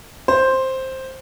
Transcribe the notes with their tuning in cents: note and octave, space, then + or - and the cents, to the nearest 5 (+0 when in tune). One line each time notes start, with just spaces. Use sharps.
C5 +5